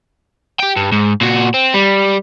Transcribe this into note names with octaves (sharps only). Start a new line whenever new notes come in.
G4 G5
G2
G#2
A#2 F#4
C4
G3